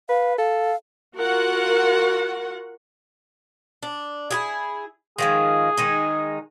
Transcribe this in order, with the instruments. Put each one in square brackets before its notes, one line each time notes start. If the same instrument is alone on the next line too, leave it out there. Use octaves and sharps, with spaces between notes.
[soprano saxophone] B4 [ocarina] F5
[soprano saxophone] A4 [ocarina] F5
[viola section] F4 F#4 A#4 F#5
[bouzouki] D4
E4 G4 G#4
[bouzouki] D#3 F3 G#3 [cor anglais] G#4
[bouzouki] D#3 G#3 D#4